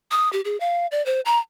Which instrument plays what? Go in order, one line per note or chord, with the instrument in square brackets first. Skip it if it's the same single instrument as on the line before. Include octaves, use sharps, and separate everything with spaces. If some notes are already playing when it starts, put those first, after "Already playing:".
[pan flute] D#6
G4
G#4
F5
D5
C5
A#5